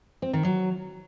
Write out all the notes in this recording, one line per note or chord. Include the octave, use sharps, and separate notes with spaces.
C4
D#3
F#3